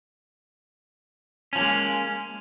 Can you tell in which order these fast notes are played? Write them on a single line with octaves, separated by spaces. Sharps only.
C#4 F3 A#3 G#3